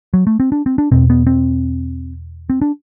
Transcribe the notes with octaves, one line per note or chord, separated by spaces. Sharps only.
F#3
A3
C4
D4
C4
D4
E2 B2 C4
B3
C4
C4
D4